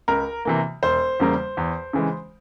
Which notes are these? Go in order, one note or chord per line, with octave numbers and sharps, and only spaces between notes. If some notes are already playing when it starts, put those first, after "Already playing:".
C#2 A#4
C3 E3 A#3
E1 C5
E2 C#3 G3 A#3
E2
C#3 E3 G#3